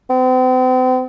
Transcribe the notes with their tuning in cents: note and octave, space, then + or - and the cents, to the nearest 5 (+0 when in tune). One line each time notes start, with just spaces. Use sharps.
C4 -40